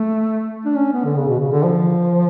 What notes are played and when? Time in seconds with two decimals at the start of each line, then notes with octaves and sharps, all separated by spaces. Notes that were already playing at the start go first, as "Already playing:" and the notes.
Already playing: A3
0.66 D4
0.75 C#4
0.93 B3
1.05 D3
1.17 C#3
1.29 B2
1.40 C#3
1.52 D3
1.64 F3